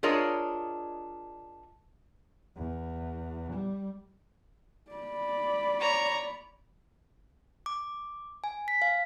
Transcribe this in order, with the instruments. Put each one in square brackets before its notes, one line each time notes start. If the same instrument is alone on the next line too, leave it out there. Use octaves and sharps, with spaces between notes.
[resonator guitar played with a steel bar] D4 F4 G#4 A#4 C#5 D#5
[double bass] E2
G3
[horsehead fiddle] D5 B5
[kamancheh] C#5 A#5
[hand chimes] D6
G#5
B6
F5